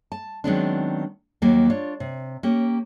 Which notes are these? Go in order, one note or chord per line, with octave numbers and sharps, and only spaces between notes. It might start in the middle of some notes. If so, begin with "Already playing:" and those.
A5
D#3 F#3 G#3 B3 C4 D4
D#2 F#3 A#3 G4
D4 F4 C#5
C3
A#3 C#4 G4